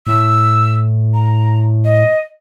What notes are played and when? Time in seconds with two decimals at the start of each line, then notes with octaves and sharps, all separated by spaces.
0.07 A2 E6
1.14 A#5
1.85 D#5